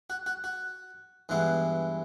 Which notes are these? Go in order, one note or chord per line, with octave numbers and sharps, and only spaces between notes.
F#4
F#4
F#4
G2 E3 G#3 B3 E4